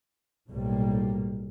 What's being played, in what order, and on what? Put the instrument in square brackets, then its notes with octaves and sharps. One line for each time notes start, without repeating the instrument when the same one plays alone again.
[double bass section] B1 A2 C3 G3 A#3